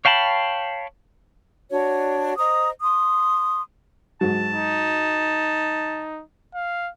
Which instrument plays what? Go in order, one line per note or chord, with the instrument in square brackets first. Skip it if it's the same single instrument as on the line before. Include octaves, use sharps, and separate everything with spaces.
[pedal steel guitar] C#5 F5 G5 A5 B5
[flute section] D4 F#4 C#5
C5 D#5 A#5 D#6
C6 D#6
[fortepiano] G#2 F#3 [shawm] A5
[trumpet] D#4
F5